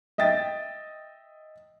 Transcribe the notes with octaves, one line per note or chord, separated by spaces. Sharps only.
D#5 E5 G5 A6